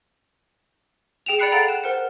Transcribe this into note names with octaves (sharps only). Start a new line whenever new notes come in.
G#4 G5 E7 F7
D5 G5 B5 F#6 C7 C#7
A4 F5 F#5 A#5 A6 D7
F#6 E7
A#4 C5 F#5